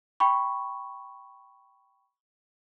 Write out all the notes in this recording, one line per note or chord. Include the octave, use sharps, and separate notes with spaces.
G5 B5 C#6